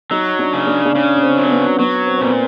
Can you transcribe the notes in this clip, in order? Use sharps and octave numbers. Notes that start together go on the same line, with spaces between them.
F#3 D#4
D4
C#3
D4
D4
C#3 C#4
C#4
C4
F#3
C4
B3
F#3 B3
C4
A#2 C4
B3